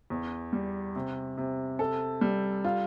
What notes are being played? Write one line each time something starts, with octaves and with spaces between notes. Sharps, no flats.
E2
G3
C3
C3
A4
G3
F4